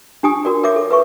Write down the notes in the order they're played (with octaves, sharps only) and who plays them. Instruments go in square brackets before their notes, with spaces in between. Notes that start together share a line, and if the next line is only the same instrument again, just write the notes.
[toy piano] D4 G4 G#5 D#6
F#4 A#4 D5
A#4 C#5 E5 D6
A4
B4 E5 C#6